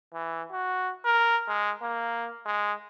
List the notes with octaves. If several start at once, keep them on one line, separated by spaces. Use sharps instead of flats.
E3
F#4
A#4
G#3
A#3
G#3